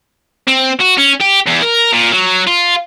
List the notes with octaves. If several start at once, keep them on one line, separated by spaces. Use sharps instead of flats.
C4
F#4
C#4
G4
E2
A#4
A#2
F#3
F4